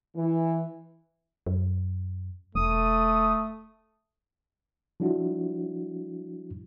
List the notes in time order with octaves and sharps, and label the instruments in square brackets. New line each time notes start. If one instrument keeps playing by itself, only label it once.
[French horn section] E3
[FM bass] F#2
[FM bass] E1 [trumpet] A3 [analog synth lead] D#6
[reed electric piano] F3 G3 D4 E4 F#4